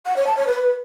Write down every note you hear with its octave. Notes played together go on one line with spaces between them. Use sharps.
F#5
C#5
A5
C#5
B4